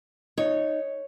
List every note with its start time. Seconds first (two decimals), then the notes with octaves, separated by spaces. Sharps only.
0.38 D#4 C#5